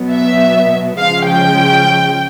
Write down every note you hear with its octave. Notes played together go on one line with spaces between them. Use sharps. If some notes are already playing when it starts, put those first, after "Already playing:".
Already playing: B2 F#3 B3
E5
C#3 F3 G#3 C#4 F5
G5